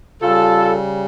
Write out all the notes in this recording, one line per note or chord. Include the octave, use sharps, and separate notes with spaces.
C#3 G3 F4 A4